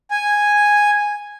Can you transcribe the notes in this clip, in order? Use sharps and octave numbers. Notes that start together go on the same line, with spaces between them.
G#5